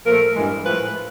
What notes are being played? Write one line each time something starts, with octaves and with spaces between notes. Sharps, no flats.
A#2 F3 A3 A#4
G2 E3 G#3
A2 F3 A3 B4